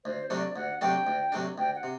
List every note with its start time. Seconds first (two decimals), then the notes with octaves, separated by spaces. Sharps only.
0.05 D2 C5
0.30 C3 F#3 A3 D4 D5
0.56 D2 F#5
0.81 C3 F#3 A3 D4 G5
1.07 D2
1.32 C3 F#3 A3 D4
1.58 D2 G5
1.75 F#5
1.83 C3